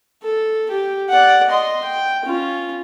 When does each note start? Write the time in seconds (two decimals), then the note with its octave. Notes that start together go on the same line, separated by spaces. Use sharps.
0.23 A4
0.71 G4
1.10 D5 F#5
1.50 D#5 C6
1.84 G5
2.26 C#4 F4